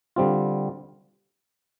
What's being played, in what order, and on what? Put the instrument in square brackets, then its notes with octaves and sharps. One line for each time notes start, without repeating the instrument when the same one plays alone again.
[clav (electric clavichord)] D3 G3 C4 F4